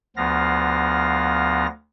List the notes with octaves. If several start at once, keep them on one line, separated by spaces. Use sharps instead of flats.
D2 F3 B3 F5 A#6